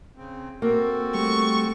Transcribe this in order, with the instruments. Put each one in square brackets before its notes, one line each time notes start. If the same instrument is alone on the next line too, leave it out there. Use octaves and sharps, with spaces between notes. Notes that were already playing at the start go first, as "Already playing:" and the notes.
[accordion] C#3 C4
[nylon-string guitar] A#3 [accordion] C4 F#4 A4
[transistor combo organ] G3 A3 [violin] C#6